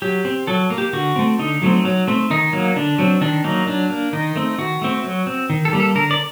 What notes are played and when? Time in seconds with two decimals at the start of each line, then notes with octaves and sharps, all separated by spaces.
0.02 F#3 G4
0.25 C4
0.47 F#3 A4
0.70 A#3
0.78 G4
0.93 D3 F#4
1.16 A3 C4
1.39 D3 D#4
1.62 F#3 A3 C4
1.85 F#3
2.07 A3 C4
2.30 D#3 D#4
2.53 F#3 A#3
2.76 D3 D4
2.99 F#3 C4
3.21 D#3 D4
3.44 F#3 A#3 D#4
3.67 F#3 D4
3.90 A#3
4.13 D#3 D#4
4.36 A3 C4
4.58 D#3 F#4
4.82 A3 C4
5.04 F#3
5.27 C4
5.50 D#3
5.65 A4
5.73 G3 A#3
5.80 A4
5.95 D3 A#4
6.11 D5